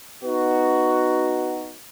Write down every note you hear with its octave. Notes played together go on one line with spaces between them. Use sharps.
B3 D#4 F#4